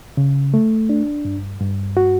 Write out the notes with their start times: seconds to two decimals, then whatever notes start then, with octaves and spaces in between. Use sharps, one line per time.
0.17 C#3
0.54 A3
0.89 D4
1.25 G2
1.61 G2
1.97 F#4